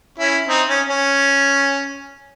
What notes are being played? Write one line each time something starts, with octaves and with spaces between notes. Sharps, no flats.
C#4 E4
C4 D#4
C#4
C#4